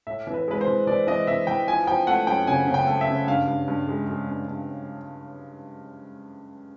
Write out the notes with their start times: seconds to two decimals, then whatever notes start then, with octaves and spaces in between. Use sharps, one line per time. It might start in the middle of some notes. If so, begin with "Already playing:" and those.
0.07 A2 E5
0.27 E3
0.34 B4
0.48 G#3 B4
0.61 C5
0.67 E3
0.87 E3 D5
1.07 E3 D#5
1.27 E3 E5
1.47 E3 G5
1.67 F3 G#5
1.87 F3 G5
2.07 A3 F#5
2.27 F#2 G5
2.47 C#3 G#5
2.67 C#3
2.74 G5
2.87 A3
3.01 E5
3.07 C#3
3.27 G2 F5
3.47 G2
3.68 G2
3.88 G#3
4.07 G#3
4.28 G2
4.48 G2